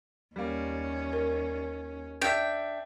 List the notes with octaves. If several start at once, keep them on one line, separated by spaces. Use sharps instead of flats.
D#2 G3 A#3 C#4
A#4
D4 E5 G5